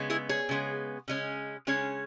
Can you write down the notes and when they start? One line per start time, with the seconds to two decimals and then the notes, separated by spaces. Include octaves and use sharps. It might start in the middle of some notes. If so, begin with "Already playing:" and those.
Already playing: C#3 G#3 B3
0.10 E4 G#4
0.29 G#4 C#5
0.49 C#3 G#3 B3
1.08 C#3 G#3 C#4
1.67 C#3 G#3 C#4 G#4 C#5